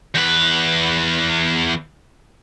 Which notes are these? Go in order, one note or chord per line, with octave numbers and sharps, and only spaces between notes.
E2 B4